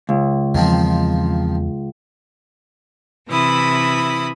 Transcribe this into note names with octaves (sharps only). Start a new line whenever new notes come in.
C#2
E2 D#3 F3 C4
C3 E3 E4 B5 D#6